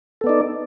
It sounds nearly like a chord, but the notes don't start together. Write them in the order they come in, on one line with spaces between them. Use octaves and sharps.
A4 B3 D5 D#4